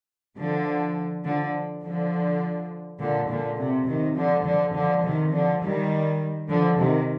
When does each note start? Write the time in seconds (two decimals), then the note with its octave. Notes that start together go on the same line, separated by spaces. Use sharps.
0.37 D3 F3
1.25 D3 F3
1.83 D3 F3
2.99 A#2 D3
3.28 A#2 D3
3.58 C3
3.86 C3 D#3
4.15 D3 F3
4.45 D3 F3
4.74 D3 F3
5.03 C3 D#3
5.33 D3 F3
5.61 D#3 G3
6.48 D3 F3
6.78 C3 D#3